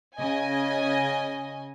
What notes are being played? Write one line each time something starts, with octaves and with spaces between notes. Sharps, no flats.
C#3 D#5 G#5